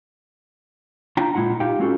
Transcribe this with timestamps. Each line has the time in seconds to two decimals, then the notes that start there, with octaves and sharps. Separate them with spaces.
1.17 D4 F4 G5 A5 A#5
1.35 A#2 G#3 E4 F4 F#5
1.60 D#4 G4 F5 G5
1.79 G#3 C4 C#4 F4 F#4 A4